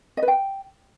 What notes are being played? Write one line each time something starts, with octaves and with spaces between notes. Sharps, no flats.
D#5
B4
G5